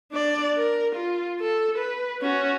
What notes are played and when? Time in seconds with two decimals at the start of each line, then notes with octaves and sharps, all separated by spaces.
0.12 D4 D5
0.57 A#4
0.95 F4
1.41 A4
1.78 B4
2.21 C#4 F#4